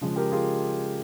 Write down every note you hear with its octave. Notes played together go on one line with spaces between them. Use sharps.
C#3 F3 G#3
G4 A#4
F4 G#4